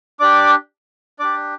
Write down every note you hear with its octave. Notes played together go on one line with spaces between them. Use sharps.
D4 G4 D5 D6
D4 G4 D5 D6